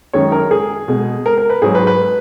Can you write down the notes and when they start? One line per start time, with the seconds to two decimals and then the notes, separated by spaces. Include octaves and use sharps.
0.13 F#2 D#3 G#3 C#5
0.32 A#4
0.51 G#4
0.88 B2 G#3
1.26 A#4
1.38 A#4
1.50 B4
1.62 G#2 F#3 G#4
1.75 B4
1.87 B4